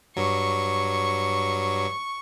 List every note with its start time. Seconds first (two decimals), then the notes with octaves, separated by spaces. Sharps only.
0.16 G2 F#3 C#6